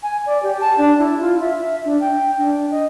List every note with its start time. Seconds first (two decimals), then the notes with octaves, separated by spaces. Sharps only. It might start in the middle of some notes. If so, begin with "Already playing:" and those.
0.03 G#5
0.26 D5
0.43 G4
0.61 A5
0.78 D4
0.99 E4
1.21 F4
1.41 E5
1.85 D4
2.01 G5
2.38 D4
2.71 D#5